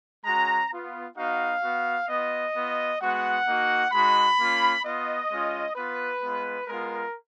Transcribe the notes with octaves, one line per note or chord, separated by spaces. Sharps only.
G#3 C#4 F#4 A#5
B3 F4
B3 D#4 F#4 F5
B3 F#4
B3 F4 D#5
B3 F4
G#3 B3 F#4 F#5
A#3 D#4 F#4
G#3 D#4 F#4 B5
A#3 C#4 F4
B3 F4 D#5
G#3 C#4 F4
B3 F4 B4
G#3 B3 F4
G#3 B3 F4 A#4